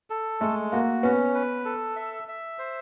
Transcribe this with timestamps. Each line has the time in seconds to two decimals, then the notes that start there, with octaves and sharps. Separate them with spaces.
0.10 A4
0.41 G#3 A3
0.72 A#3 F#4
1.03 B3 C#4
1.34 B4
1.65 A4
1.96 E5
2.28 E5
2.59 C5